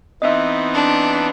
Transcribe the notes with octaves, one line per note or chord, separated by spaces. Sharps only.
E3 B3 C4 D#4 D#5 E5
D4